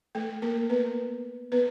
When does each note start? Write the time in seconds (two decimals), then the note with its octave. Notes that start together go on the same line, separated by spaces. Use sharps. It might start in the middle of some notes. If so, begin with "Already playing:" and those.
0.15 A3 A4
0.42 A#3 A#4
0.70 B3 B4
1.52 B3 B4